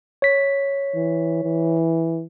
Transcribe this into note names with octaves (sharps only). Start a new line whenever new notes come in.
C#5 B6
E3
E3